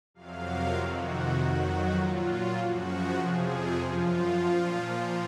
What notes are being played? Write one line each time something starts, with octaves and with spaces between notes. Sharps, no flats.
F2 C3 F#3 F5
A#4
F2 C3 D#3 F#4
F2 D#3 F#3 F#4
A#2 F#3 F4
F#2 C#3 F3 F#4
F2 C3 F3 G#4
F#2 F3 F4
A#2 F3